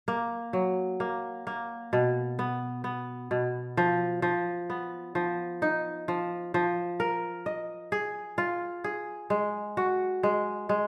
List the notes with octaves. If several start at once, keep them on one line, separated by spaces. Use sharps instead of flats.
A#3
F#3
A#3
A#3
B2
B3
B3
B2
F3
F3
B3
F3
D#4
F3
F3
A#4
D#5
G#4
F4
G#4
G#3
F#4
G#3
G#3